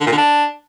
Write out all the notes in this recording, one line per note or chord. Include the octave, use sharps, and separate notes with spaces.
D3
A#2
D3
D4